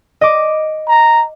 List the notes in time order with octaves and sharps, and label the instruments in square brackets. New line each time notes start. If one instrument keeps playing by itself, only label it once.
[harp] D#5 D6
[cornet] A#5